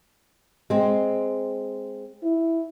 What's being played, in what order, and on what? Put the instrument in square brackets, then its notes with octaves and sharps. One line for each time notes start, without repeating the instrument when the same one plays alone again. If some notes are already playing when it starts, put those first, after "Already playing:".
[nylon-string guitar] G#3 C4
[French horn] E4